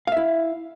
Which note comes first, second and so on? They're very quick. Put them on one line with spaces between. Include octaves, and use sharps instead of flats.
F5 E5 E4